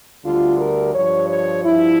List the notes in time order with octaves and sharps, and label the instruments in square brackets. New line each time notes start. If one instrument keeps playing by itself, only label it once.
[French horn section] D2 D3 G3 F4
A#4
G2 F3 C#5
C#5
G2 F3 E4